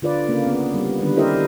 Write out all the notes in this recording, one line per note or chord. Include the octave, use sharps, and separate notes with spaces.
D3 F4 B4 D5
C#3 A#3
B3
G3
D3 D#3 G3 B4
E4 G4 A#4 C5 D#5 E5